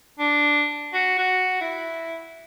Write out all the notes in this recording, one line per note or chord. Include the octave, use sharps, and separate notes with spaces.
D4
F#4
F#4
E4